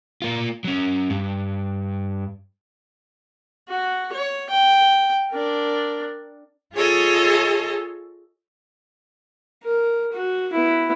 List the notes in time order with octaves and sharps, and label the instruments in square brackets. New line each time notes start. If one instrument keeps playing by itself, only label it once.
[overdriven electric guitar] A#3 F4
F#3 C#4
G2
[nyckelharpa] F#4
C#5
G5
D4 A#4
[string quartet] F4 G#4 A4 C#5 D#5
[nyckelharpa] A#4
F#4
B3 E4